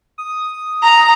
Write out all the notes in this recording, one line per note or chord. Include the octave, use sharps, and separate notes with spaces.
D#6
A#5